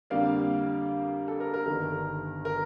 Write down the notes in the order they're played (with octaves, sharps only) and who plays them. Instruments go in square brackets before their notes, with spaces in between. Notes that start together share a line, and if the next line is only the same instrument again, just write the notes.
[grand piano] F2 D3 G3 A#3 D5 F5
A4
A#4
A#4
G1 G2 D#3 A#4
A#4